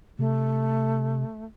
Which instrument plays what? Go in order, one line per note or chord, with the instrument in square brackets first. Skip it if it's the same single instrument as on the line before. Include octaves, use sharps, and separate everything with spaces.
[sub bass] C3 [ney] A3